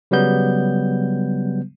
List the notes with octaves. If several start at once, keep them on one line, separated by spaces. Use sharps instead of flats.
C#3 F#3 G3 B3 G6